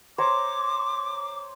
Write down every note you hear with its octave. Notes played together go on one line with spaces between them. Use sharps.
C5 C#5 A#5 D6